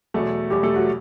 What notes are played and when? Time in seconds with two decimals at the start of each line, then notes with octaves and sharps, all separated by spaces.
0.14 E2 B2 F#3 A3 A4
0.50 E2 B2 F#3 G3 G4
0.63 A3 A4
0.75 F#3 F#4